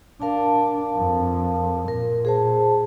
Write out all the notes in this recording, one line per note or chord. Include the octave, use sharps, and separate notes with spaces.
D4 A#4 F5 A5
F2
A#2 A#4
G#4 C5 A5